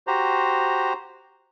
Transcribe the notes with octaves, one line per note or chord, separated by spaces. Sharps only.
F#4 G4 C5 A#5